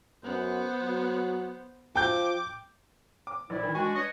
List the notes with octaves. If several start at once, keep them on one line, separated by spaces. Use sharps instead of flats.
F#2 B3 C5
F#3
F3 G5 D6 G6
D6
A#1 E4 D5
D#3 E3
G#3 D4 F#4 G#5
B4 C#5 D#5